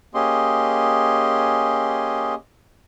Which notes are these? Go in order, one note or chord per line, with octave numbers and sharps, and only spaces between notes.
A#3 C#4 G4 G#4 D#5 C6